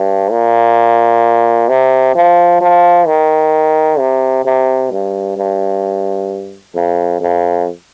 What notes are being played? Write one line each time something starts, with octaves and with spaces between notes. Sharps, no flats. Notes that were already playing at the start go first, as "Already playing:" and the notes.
Already playing: G2
A#2
C3
F3
F3
D#3
C3
C3
G2
G2
F2
F2